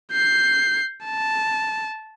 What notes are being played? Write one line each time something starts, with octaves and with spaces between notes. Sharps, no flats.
G6 C7
A5